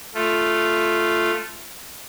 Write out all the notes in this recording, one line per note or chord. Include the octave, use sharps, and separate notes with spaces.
A3 F4